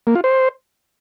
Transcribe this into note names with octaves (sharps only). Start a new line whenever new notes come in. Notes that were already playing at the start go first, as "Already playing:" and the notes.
A#3
F4
C5